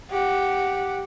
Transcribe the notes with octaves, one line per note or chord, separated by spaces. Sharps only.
G4 F#5